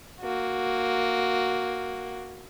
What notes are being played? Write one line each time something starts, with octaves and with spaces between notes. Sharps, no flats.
A#3 F#4